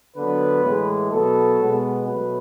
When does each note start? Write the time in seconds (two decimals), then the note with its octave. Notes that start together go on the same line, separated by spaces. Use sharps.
0.15 D3 F#3 B3 B4
0.63 A2 E3 G#3
1.10 B2 F#3 B3 A4
1.58 B2 G#3 B3
2.06 B2 F#3 A3 B4